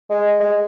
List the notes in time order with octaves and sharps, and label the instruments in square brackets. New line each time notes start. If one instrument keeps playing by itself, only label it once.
[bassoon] G#3
G#3